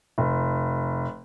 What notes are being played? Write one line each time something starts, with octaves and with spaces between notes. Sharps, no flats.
F1